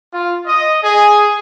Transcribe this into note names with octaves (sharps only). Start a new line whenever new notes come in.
F4
D#5
G#4